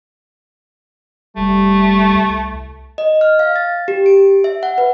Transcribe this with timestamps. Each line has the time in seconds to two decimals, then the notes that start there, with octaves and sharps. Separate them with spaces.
1.36 F1 G3 A3
2.13 C2
2.98 D#5
3.21 F6
3.39 F5
3.56 A6
3.88 G4
4.06 D7
4.44 E5
4.63 F#5
4.78 B4